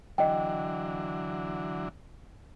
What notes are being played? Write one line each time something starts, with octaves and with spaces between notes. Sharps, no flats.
D3 E3 F#3 D#5 G5